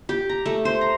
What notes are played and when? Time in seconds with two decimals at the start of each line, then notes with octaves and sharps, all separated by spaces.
0.09 G4
0.29 A#5
0.46 A3
0.65 C5
0.81 A#5